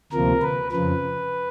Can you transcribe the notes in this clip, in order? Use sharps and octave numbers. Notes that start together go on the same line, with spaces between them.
D2 C3 F3 A#3 A#4
B4
F2 C#3 F3 B4